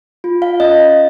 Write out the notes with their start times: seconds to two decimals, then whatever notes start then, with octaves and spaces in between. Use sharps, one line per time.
0.24 F4
0.42 F5
0.60 C#4 D#5